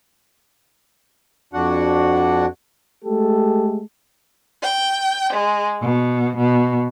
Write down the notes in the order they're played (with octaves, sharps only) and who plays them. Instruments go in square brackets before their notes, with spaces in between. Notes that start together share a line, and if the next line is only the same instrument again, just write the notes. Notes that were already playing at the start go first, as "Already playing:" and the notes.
[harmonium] F2 D4 F#4 F#5
[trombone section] G#3 A3 G4 A4
[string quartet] G5
G#3
B2
B2